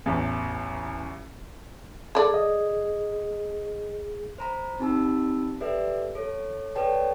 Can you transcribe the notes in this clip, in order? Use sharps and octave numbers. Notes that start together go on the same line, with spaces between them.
A1 E2
G#4 A4 D5
D#5
C5 A#5 B5
C4 D#4 G4 A5 B5 E6
G4 A4 B4 D5 E5
A4 C#5
A4 B4 C#5 D5 G5 A5